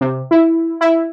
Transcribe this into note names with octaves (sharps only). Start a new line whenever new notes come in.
C3
E4
E4